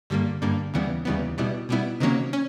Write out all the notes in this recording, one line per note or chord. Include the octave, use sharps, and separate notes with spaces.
G2 D3 G3 A#3
G2 D3 G3 A#3
D#2 C#3 E3 G3 B3
D#2 C#3 E3 G3 B3
B2 G3 B3 E4
B2 G3 B3 E4
C3 D#3 F#3 A#3 C#4
C#4